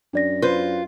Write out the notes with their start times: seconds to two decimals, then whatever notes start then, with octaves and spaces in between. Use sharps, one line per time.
0.13 F#2 D4 D5 A#6
0.42 F4 B4 C5